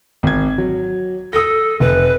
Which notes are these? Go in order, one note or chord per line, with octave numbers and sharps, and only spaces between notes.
G#1 G#6
F#3
A4 D#6 A#6
F1 B4